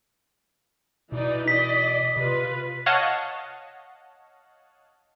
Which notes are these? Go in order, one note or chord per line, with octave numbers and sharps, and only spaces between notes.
B2 E3 D#4 D5
D5 D#5 B6
C3 F4 B4
C#5 D#5 F5 F#5 A5